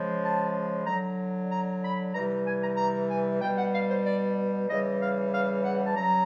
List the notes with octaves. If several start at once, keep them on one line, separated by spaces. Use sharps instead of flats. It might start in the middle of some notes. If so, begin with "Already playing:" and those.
Already playing: C#3 F3 G#3
A5
D3 F#3 A#5
A#5
B5
C3 E3 G3 A#5
G#5
A#5
A#5
G#5
B2 G3 G5
F#5
F5
C5
D5
C#3 E3 G3 D#5
F5
F5
F#5
A5
C#3 F#3 A#5